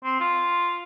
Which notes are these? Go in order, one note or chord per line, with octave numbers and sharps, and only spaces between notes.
C4
F4